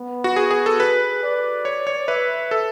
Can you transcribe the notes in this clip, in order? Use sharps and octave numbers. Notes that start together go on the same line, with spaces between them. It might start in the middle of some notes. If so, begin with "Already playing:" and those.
Already playing: B3
F#4
G#4
G#4
A4
G#4 B4
D5
C#5
C#5
B4 E5
A4